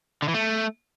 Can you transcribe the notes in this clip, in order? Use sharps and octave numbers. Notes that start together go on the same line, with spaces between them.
D3
E3
A3